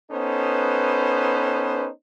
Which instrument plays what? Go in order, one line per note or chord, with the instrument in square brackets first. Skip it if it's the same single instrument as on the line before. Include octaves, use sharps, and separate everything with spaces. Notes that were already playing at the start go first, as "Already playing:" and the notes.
[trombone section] B3 C#4 D#4 A4 B4 C5